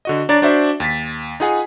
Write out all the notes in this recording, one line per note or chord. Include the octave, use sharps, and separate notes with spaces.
D3 F#4 D#5
D4 C#5 D5 A#5 A6
D4 F#4 C5 D5 E5
D#2 A6 B6
D#4 F4 G#4 F#5 G#5